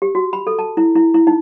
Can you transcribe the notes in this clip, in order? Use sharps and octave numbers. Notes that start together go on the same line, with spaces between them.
G4
F#4
B5
A4
A5
E4
E4
E4
D#4